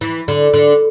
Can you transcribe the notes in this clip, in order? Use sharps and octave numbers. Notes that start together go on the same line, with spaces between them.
E3
D3
D3